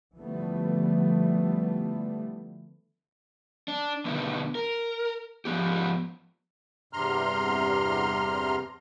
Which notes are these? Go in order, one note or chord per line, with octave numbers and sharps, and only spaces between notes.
D3 E3 F3 G3 A3 B3
D4
B2 D3 D#3 B3
A#4
G#2 F3 B3 G4
E2 G2 C3 A#5 C6 F6